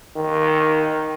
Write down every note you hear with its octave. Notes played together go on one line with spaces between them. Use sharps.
D#3